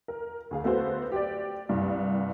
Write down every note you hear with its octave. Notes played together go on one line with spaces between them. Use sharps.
A#4
D2 G#4 F5
A3 B3 F#4 C5
G4 D5
C2 G2